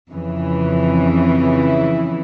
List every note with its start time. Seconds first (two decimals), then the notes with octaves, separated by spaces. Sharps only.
0.10 F2 C#3 E3
1.30 E4